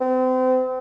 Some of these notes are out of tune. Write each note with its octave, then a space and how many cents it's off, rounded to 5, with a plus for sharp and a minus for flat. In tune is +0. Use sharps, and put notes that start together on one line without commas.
C4 -35